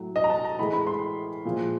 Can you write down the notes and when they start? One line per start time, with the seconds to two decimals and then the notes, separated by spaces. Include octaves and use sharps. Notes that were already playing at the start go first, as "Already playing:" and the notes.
Already playing: A2 F#3
0.16 D#5
0.24 A#5
0.30 A5
0.44 A#5
0.59 A2 E3 G#3 B5
0.73 B5
0.87 C6
1.45 A#2 F3 G#3